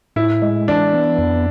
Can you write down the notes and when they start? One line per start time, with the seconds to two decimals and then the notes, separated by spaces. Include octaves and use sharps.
0.16 A2 E4
0.42 G#3
0.68 E3 D4
0.93 B3
1.18 F2